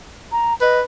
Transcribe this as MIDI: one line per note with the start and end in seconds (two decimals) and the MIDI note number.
0.31 0.53 82
0.61 0.82 71
0.61 0.78 75